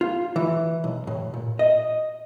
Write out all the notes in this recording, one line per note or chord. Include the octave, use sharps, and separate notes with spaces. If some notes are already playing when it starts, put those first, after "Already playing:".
F4
E3
B1
A2
A#2
D#5